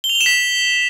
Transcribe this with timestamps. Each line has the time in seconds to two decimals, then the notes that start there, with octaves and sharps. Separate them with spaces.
0.04 G7
0.10 F7
0.15 G7
0.21 E7
0.26 B6